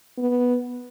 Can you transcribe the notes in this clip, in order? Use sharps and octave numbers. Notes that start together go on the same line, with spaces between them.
B3